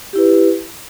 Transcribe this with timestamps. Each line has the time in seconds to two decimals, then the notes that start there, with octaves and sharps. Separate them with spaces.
0.13 G4
0.16 E4
0.18 B4